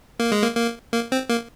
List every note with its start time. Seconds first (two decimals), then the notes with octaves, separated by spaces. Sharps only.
0.20 A#3
0.32 G#3
0.42 A#3
0.56 A#3
0.94 A#3
1.12 C4
1.30 A#3